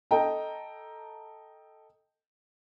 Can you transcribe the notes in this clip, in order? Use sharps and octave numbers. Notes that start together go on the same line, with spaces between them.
A4 D#5 G5 A#5